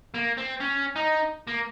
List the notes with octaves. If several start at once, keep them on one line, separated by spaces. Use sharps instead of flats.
A#3
C4
C#4
D#4
A#3